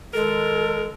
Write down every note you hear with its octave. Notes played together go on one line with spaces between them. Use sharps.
D#3 G#3 A4 A#4